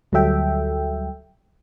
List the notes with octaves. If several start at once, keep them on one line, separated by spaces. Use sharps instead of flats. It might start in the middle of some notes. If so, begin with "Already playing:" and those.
D2 F#3 G3 A4 E5 G5